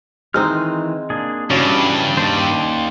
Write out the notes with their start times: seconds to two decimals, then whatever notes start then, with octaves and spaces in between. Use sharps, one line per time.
0.34 D#3 E3 G#3 C4 D#4 F6
1.10 A#3 D4 G#4
1.51 G2 C#3 E3 C#4 F#4 D5
2.17 D#2 C5 D5